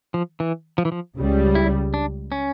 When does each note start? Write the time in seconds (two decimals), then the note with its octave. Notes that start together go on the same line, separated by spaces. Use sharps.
0.14 F3
0.40 E3
0.78 F3
0.85 E3
0.92 F3
1.16 C#2 C#3 G3
1.55 E4
1.94 D4
2.32 C#4